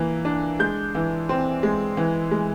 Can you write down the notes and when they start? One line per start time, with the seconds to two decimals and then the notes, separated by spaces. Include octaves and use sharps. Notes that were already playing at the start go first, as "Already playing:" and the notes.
Already playing: E3 A#3
0.25 D4
0.59 G#3 G6
0.95 E3
1.29 C4
1.63 G#3
1.97 E3
2.31 G#3